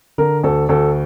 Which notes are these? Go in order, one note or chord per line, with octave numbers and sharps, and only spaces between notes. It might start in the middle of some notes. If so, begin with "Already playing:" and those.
D3 A#4
D2 A4
D2 A4